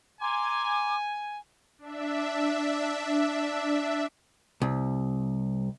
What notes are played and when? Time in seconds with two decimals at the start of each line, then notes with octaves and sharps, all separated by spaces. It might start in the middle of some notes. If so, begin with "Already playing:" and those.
0.21 G#5 A#5 C6 D6
1.78 D4 E5
4.62 C2